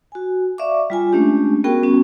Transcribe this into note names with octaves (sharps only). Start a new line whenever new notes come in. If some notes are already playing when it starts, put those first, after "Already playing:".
F#4 G#5
D5 E5 F5 C#6 D6
G3 F4 G#5
G#3 A3 C#4 D4 G4
B3 C#4 F#4 G#4 A#4 G5
G3 B3 C#4 F#4 G4